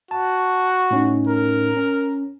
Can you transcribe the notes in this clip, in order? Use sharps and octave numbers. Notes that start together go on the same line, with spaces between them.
F#4 A5
A2 C#4 D#4
A#4
C#4